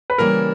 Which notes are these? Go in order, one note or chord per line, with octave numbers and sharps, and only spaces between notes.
B4
C#3 E3 G3 A#3 E4 A#4